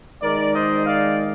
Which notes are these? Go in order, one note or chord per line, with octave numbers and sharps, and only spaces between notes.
D#3 G#3 D#4 A#4 D5
C5 D#5
D5 F5